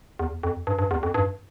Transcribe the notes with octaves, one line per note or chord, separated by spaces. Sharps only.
E2
F2
G2
G2
E2
F2
G2